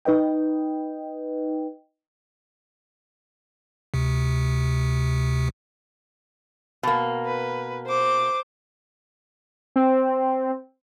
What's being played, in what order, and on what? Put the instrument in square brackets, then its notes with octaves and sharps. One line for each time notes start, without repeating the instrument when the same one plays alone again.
[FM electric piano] D#4 B4 D#5 G5
[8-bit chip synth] D2 C3
[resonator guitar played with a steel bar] B2 A#3
[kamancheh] B4
C5 D6
[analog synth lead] C4